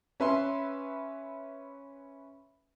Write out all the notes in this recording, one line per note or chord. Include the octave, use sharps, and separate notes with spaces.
C#4 B4 E5 C6